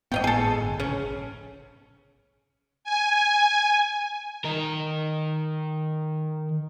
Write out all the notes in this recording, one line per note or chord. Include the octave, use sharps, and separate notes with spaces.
G#1 A2 B3 D#5 F5 G5
G#4 A4
G1
A#1 C#3 C#4
G#5
D#3 A#4